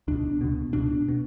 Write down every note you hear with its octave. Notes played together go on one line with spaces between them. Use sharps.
C#2 B2 D4
C#2 B2
C#2 B2 D4
B2